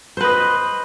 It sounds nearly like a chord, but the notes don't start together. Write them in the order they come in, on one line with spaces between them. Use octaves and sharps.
C5 B4 D#5